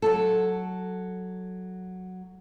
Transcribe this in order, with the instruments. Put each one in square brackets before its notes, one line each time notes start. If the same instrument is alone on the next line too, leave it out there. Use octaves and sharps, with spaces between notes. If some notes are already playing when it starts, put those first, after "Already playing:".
[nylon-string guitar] F#3 A4